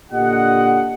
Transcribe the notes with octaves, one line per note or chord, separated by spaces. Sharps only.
A#2 D3 G4 D#5 F#5